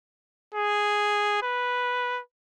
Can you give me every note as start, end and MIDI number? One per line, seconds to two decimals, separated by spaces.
0.54 1.42 68
1.43 2.21 71